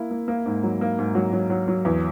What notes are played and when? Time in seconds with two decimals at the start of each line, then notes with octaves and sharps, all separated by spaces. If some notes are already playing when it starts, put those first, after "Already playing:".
Already playing: A#3 E4
0.11 A#3
0.28 A#3
0.46 G#2
0.63 F#3
0.81 A#3
0.99 G#2
1.15 F#3
1.33 F#3
1.50 F#3
1.68 F#3
1.85 E2